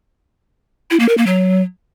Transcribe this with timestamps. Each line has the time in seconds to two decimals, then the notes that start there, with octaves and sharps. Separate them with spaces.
0.91 E4
1.00 A#3
1.09 A#4
1.18 A#3
1.26 F#3